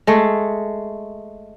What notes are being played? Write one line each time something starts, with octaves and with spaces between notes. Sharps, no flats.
G#3 A3